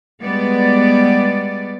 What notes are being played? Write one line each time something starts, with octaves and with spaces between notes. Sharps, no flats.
G3 G#3 B3 D5